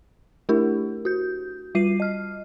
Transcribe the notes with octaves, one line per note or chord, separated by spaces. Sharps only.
A3 D4 E4 G4 A#4
F#4 G6
G3 F4 C7 D#7
D#5 F6